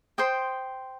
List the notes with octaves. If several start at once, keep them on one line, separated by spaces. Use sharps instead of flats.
C5 G5 C6 D#6